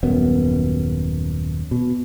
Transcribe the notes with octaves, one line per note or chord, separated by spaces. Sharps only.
D#1 F#2 B3
B2